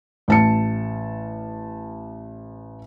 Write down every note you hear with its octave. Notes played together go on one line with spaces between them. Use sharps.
A1 A5 C#7